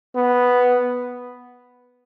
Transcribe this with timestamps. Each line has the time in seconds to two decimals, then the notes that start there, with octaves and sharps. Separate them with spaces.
0.15 B3